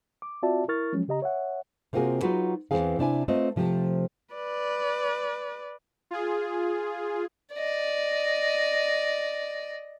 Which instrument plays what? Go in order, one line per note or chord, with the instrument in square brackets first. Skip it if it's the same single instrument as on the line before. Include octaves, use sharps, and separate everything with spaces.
[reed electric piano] D6
C4 F4 F#4 D5 E5 A5
E4 A#4 C#6 F6 A6
F3 F#3 G#3 C#4
C#3 G4 D#5 A#5
C#5 E5 F#5
[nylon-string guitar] C3 A#3 C4 F4 F#4 G#4
F#3 D#4 F4 F#4 G#4 B4
E2 C#3 E3 C4 G#4 F5
C3 D4 E4 G#5
A3 C4 F4 B4 D#5
C3 F3 A3 G4
[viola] B4 D5
[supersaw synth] F4 G#4
[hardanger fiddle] D5 D#5